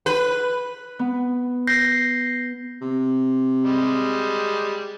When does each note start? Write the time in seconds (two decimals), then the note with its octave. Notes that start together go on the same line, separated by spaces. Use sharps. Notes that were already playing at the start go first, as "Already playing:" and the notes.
0.06 B4
0.99 B3
1.67 G6 A#6 C7
2.81 C3
3.64 G3 G#3